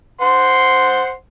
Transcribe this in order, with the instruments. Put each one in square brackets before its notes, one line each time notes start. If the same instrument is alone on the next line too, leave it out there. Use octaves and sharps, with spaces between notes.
[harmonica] C5 F#5 C6